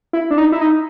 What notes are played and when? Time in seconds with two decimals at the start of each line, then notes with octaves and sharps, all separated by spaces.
0.13 E4
0.31 D4
0.38 D#4
0.52 E4
0.61 D#4